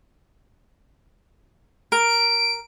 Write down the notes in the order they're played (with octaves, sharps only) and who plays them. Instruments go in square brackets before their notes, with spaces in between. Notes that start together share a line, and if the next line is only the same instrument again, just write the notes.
[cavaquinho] A#4 [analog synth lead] D7